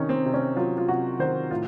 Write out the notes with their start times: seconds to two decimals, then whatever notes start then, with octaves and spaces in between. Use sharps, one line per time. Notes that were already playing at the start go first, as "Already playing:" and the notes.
Already playing: C3 D#3 C#4 D#4
0.09 C4
0.26 C3
0.34 C#4
0.56 F#3 F4
0.78 F4
0.89 C3 F#4
1.19 D#3 C5
1.51 A2 F4